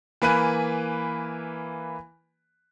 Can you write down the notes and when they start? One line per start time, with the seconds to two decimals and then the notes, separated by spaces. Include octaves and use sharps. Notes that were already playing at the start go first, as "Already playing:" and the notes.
0.22 E3 A#3 B4 G#5 F#6 D#7